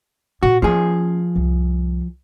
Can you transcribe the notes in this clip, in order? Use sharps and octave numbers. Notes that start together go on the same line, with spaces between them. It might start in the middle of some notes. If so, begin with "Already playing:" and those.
A#2 A#3 F#4
F3 A#3 C#4 G#4
C2 F2